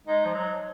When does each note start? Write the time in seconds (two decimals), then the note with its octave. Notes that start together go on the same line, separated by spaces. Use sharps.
0.07 G#3 D#4
0.25 F3
0.34 F#3